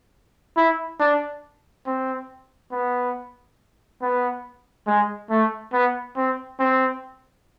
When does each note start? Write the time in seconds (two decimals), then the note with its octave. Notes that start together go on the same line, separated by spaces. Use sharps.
0.57 E4
1.00 D4
1.87 C4
2.72 B3
4.01 B3
4.87 G#3
5.30 A3
5.73 B3
6.17 C4
6.59 C4